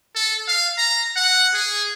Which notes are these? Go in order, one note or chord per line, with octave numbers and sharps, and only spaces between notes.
A4
F5
A#5
F#5
G#4